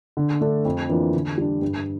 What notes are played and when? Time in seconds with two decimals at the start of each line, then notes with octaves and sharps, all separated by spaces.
0.17 D3
0.41 A3 D4 A4
0.65 F2
0.89 E3 A#3 D4 F4
1.14 D3
1.38 G3 D4
1.62 G2